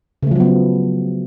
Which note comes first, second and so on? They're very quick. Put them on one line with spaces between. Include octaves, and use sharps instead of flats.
C#3 A3 F3 F#3 B3